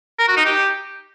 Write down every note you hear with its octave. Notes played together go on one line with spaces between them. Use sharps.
A#4
F#4
D#4
G4